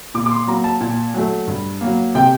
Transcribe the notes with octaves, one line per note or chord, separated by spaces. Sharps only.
A#2 D6
D6
C6
F#3 A#3 A#5
A5
A#2
F#3 A3
G2
F#3 A#3
C3 G5